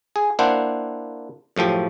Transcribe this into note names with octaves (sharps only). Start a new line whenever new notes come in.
G#4
A#3 D4 E4 C5 F#5
F#2 A2 F3 G4